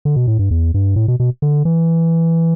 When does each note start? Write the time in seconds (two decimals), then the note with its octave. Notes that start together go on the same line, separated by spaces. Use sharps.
0.05 D3
0.16 B2
0.27 A2
0.39 G2
0.51 E2
0.74 G2
0.96 A2
1.08 B2
1.20 B2
1.42 D3
1.65 E3